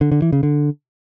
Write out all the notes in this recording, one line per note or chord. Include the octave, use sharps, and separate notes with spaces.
D3
D3
E3
C#3
D3